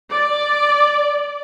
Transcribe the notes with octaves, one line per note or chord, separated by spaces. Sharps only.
D5